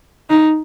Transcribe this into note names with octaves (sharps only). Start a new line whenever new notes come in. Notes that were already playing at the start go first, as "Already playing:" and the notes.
D#4